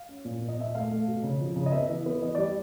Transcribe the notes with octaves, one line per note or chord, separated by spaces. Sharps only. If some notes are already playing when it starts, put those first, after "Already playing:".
Already playing: F5
C#4
A#2
A#2
D#5
A#2 E5
A3 F5
A3
B2
C#3
F3
C#3
D#5
B3 E5
E3
B3
E3 D#5
G3 D5